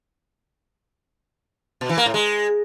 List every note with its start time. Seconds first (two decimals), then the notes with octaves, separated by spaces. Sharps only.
1.81 B2
1.89 E3
1.98 A#3
2.06 A2
2.14 G#3